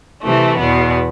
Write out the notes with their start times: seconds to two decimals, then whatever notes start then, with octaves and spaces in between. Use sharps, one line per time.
0.24 C3 E3 A3
0.58 E2 B2 B3